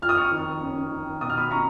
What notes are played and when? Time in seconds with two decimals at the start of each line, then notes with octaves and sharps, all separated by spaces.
0.02 F2 F6
0.09 D#6
0.17 C#6 F6
0.31 D#3
0.61 C#4
0.90 D#3
1.21 B2 D#6
1.30 F6
1.37 B5 D#6
1.51 C#4 A#5 C#6